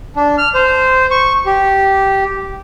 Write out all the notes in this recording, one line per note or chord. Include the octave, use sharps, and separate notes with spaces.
D4
F6
C5
C#6
G4